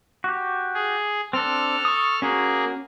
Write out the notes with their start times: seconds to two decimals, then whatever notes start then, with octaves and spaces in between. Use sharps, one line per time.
0.24 F#4 G4
0.74 G#4
1.33 C4 D4 A4 F6
1.85 C#6 D#6
2.22 A#3 C#4 F#4 G#4